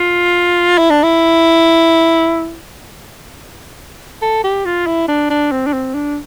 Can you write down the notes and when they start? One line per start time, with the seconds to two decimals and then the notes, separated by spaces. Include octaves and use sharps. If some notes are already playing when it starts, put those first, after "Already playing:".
Already playing: F4
0.78 E4
0.90 D4
1.03 E4
4.22 A4
4.44 G4
4.65 F4
4.87 E4
5.08 D4
5.30 D4
5.52 C4
5.67 D4
5.73 C4
5.95 D4